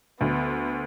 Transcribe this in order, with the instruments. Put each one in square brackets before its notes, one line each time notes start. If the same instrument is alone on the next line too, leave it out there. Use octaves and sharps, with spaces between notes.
[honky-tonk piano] D2 [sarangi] B3